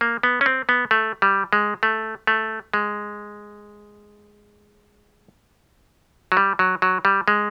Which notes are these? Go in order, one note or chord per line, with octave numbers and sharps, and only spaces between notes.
A#3
B3
C#4
C4
B3
A3
G3
G#3
A3
A3
G#3
F#3
G3
F#3
F#3
G3
G#3